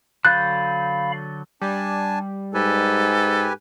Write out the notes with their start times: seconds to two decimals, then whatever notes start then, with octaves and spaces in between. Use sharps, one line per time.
0.25 D3 F#3 F5 B5 F#6 G6 A6
1.62 G3 D4 G#5 A5
2.54 G#2 G4 A4 B4 G#5